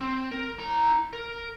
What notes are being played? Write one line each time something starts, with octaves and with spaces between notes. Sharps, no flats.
C4
A#4
E4 A#5
A#4